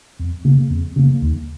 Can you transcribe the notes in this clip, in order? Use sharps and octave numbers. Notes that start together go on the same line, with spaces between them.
F2
C#3 A#3
F2
C#3 A#3
D#2